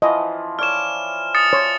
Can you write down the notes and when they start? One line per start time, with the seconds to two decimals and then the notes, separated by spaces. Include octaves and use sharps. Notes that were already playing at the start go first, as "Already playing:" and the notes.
0.02 E3 F3 D#5
0.59 C#5 D5 F6 E7
1.35 D#6 A6 C#7
1.53 C#5 C6